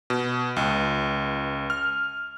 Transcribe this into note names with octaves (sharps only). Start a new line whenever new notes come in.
B2
C#2
F6